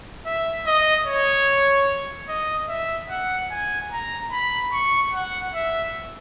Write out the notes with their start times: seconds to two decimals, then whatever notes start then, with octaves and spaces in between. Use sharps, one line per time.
0.26 E5
0.66 D#5
1.06 C#5
2.29 D#5
2.69 E5
3.10 F#5
3.51 G#5
3.92 A#5
4.32 B5
4.73 C#6
5.13 F#5
5.54 E5